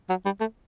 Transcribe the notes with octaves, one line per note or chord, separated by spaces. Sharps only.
F#3
G3
A3